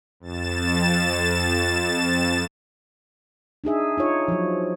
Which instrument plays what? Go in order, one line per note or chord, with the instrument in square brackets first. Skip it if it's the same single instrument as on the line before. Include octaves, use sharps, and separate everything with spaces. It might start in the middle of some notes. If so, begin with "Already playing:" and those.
[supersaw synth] F2 A6 E7
[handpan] D4 D#4 G#4 E5
D#4 F4 C#5
F3 F#3